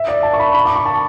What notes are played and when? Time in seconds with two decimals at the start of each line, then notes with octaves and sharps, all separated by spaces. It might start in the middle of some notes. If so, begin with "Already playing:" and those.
Already playing: E5
0.08 D5
0.23 A5
0.33 C#6
0.40 B5
0.54 B5
0.65 D6
0.76 C#6
0.86 A5